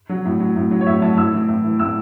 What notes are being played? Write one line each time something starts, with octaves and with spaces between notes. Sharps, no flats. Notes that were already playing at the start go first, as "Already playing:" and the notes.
F#3
A2
F#3
A2
F#3
C#5
A2 E5
F#3 A5
A2 E6
E3
A2
E3
A2 E6